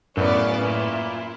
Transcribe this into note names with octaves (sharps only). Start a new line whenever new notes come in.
F#2 A2 C#3 B3 D5
A#2 E4